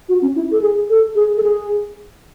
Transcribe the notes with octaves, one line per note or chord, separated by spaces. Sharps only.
F#4
C#4
E4
A4
G#4
A4
G#4
A4
G#4